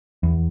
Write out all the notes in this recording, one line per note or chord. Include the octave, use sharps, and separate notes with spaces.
E2